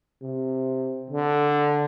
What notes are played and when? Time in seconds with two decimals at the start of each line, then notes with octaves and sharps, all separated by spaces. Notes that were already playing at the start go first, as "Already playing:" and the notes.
0.22 C3
1.10 D3